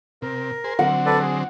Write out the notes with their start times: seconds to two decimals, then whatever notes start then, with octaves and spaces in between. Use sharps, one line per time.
0.22 C3 A#4
0.64 G#4 C5
0.79 D3 F#3 C4 F#5
1.06 A4 B4 D5
1.20 G#4